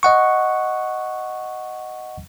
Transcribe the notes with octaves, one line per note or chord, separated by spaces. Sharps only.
D#5 F#5 C#6